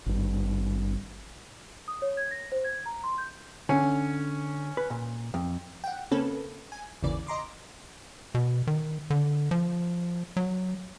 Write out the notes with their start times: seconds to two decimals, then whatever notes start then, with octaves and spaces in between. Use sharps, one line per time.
0.06 G#1 G2
1.88 D#6
2.02 C#5
2.17 G#6
2.31 A#6
2.52 C5
2.64 G#6
2.86 A#5
3.04 C6
3.18 G6
3.69 D3 C#4
4.77 B4
4.90 A#2
5.34 F2
5.84 F#5 G5
6.11 C#3 A#3 C4 C#4 A4 B4
6.72 G#5
7.03 G#1 D#2 C#3 E3 D5
7.27 D#5 A#5 C6 D6
8.35 B2
8.67 D#3
9.10 D3
9.51 F3
10.37 F#3